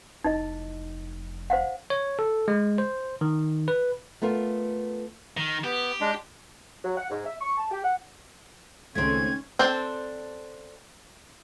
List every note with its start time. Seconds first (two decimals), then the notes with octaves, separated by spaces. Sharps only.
0.24 F1 D#4 E4 D#5
1.50 C5 F5 F#5
1.90 C#5
2.19 A4
2.48 G#3
2.78 C5
3.21 D#3
3.68 B4
4.22 A3 B3 F4 A#4
5.37 D#3
5.64 B3 G4
6.01 G#3 D4
6.84 F#3
6.97 F#5
7.10 G#2
7.26 E5
7.41 C#6
7.58 A5
7.71 G4
7.84 F#5
8.95 C#2 D#3 A3 C4 C#4 G#6
9.59 C4 D4 A4 C5